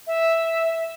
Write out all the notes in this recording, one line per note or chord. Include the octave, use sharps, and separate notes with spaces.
E5